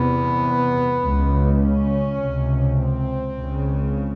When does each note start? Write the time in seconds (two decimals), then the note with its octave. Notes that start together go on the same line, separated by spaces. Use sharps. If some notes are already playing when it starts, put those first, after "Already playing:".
Already playing: E2 C3 B3
1.00 C#2 C#3
1.58 C#4
2.17 C#2 C3
2.76 C4
3.35 C#2 C#3